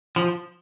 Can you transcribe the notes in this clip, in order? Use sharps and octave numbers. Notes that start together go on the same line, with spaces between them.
F3